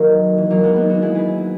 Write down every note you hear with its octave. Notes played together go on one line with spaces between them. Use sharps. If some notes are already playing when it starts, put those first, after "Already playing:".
Already playing: D#3 F#3 A#3
E3
F#3 A#3
G#3 B3
B3 D#4
D#4 F#4
E4 G#4
G#4 B4